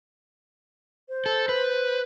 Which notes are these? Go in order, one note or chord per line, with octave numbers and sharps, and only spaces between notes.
C5
A4
B4